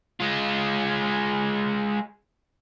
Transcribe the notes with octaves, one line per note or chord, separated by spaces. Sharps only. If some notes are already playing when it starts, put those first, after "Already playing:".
G#3 F4